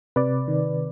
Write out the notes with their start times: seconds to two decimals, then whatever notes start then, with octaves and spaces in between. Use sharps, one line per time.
0.16 C3 B4 D5
0.48 D#3